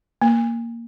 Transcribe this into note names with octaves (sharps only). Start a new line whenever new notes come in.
A#3